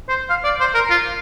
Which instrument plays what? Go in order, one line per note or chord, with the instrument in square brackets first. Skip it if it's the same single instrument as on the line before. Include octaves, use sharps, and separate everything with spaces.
[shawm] C5
F5
D5
C5
A#4
F4